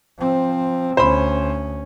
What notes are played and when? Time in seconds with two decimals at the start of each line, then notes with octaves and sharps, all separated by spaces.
0.19 F3 C4
0.97 D2 C#4 C5 B5